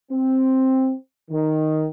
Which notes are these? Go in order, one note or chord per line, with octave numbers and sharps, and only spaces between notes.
C4
D#3